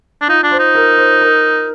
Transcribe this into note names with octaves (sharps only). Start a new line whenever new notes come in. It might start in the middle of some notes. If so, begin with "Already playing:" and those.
D4
D#4 F4
D4
C5
D#4
A#4
C5
A#4